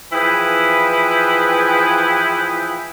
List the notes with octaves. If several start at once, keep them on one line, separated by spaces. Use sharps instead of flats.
E3 F3 E4 G#4 B4 G5